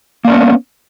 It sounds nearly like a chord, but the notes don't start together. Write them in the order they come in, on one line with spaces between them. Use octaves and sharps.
A#3 D5 C#4 B3